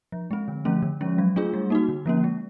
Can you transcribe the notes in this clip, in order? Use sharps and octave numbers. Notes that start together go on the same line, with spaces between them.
F3
G#3 C4
D3
F3 A3 C#4
D3
F3 G#3 C#4
F#3
A3 D4 F4 G#4
G3
A#3 D#4 F#4
D3
F3 A#3 C#4
G#3